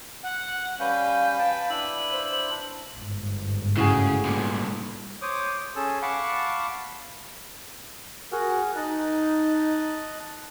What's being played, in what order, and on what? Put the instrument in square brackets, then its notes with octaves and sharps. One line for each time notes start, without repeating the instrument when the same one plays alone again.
[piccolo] F#5
[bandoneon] G3 C#4 [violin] B4 B5 [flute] F5 [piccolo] G6
[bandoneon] G5 A5
[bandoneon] D4 E4 E6 [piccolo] F#7
[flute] C5
[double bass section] G1 G#2
[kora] A2 F#4 G#4 [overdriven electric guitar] C#3
[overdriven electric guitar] G2 A#2
[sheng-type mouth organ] C5 C#5 D6 D#6
C#4 G#4 A4 E6
F5 F#5 A5 B5 C#6 D6
[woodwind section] F#4 A#4 [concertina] G#4 F#5
[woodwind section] D#4 [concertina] D#5 A5 F#6